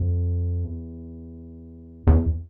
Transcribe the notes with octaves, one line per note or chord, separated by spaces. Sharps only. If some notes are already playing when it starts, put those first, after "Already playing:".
Already playing: F2
E2
E2